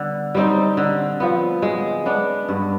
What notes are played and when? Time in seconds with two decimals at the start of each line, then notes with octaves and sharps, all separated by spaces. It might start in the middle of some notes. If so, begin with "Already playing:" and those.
Already playing: D3 G3 B3
0.35 G3 C4 D#4
0.77 D3
1.20 F3 B3
1.62 G#3
2.06 B3 D4
2.49 G2